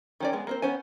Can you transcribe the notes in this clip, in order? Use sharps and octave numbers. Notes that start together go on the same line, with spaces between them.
D#3 C#4 D5
G#3 B3 G#4
A#3 C4 C5
B3 C#4 C5 G#5